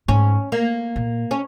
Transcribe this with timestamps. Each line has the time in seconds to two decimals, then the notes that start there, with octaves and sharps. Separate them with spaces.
0.08 G#2 C#4
0.52 A#3
0.96 A#2
1.31 C#4